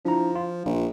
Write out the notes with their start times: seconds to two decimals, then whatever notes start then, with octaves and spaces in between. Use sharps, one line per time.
0.05 F3 D4 E4 A#5
0.36 F4
0.66 A#1